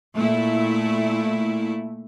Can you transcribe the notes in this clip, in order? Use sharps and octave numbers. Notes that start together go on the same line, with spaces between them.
A#2 A3 E4